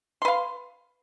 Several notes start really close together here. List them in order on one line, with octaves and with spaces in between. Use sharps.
C6 B4 F5